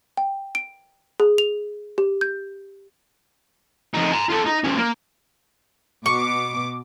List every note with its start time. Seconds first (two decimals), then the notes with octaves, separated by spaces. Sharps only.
0.17 G5
0.55 D7
1.20 G#4
1.38 F7
1.98 G4
2.21 G6
3.94 F2 D#4
4.13 G#5 A#5
4.30 F4 A4
4.46 D#4
4.64 F3 C#4
4.77 A#3
6.06 B2 C#6 D6